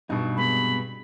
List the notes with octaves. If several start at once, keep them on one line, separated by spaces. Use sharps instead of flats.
G2 B2 D#4
C3 G#3 B3 B5